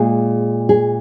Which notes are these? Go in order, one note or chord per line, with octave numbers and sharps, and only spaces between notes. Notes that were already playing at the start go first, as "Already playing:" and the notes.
Already playing: A#2 G#3 G#4
G#4